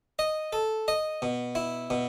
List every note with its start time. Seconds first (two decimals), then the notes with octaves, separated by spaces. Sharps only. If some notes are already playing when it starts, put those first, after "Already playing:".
0.19 D#5
0.53 A4
0.88 D#5
1.22 B2
1.55 E4
1.90 B2